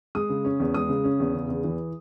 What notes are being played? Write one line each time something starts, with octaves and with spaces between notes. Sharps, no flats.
G#3 D#6
C#3
C#4
E2
G#3 D#6
C#3
C#4
E2
C#3
E2
E3